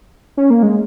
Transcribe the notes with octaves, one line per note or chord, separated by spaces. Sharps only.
C#4
A#3
G#3